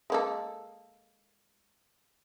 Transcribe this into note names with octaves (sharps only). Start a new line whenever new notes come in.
G#3 A#3 A4